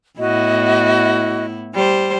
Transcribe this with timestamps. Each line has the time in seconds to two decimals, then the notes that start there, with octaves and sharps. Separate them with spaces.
0.19 A2 B3 E4 F#4 D#5
1.74 G3 C5